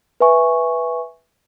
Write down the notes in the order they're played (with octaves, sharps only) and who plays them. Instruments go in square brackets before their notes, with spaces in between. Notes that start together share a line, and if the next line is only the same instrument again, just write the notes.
[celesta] B4 E5 G#5 C#6